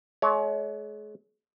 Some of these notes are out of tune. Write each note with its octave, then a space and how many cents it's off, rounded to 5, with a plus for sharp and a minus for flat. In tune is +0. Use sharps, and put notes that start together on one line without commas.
G#3 +40 C#5 +25